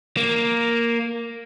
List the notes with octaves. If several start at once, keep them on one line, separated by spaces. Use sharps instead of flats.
A#3